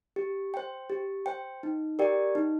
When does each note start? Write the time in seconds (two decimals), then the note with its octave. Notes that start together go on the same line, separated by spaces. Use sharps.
0.16 G4
0.54 C5 G5
0.90 G4
1.26 C5 G5
1.63 D#4
1.99 G4 A#4 D5 G5
2.35 D#4